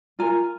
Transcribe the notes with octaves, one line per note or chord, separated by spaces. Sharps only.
F4 A#4 G#5 A#5